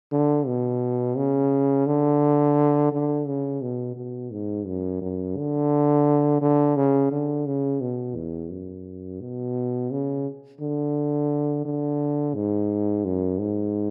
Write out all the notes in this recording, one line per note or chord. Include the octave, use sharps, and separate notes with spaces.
D3
B2
C#3
D3
D3
C#3
B2
B2
G#2
F#2
F#2
D3
D3
C#3
D3
C#3
B2
E2
F#2
B2
C#3
D3
D3
G#2
F#2
G#2